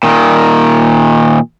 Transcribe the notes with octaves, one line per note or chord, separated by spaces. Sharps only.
A#2 D#3